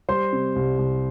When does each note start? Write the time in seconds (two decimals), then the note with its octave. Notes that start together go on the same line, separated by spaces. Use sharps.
0.09 G3 C5 C6
0.32 C3
0.56 C2
0.79 C2